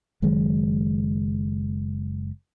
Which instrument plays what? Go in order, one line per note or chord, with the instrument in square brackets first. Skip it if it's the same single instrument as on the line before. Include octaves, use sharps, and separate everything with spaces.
[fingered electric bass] F#1 D#3 F#3 G#3